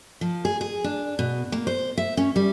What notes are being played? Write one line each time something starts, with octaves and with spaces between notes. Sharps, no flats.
F3
G#4
G#4
D4
B2
A#3
C5
E5
C#4
G3